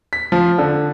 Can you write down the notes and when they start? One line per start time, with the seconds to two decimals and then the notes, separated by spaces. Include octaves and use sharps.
0.13 B6
0.32 F3
0.58 D3